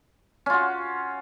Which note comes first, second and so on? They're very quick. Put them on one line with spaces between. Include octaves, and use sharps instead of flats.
C#4 F4 F#4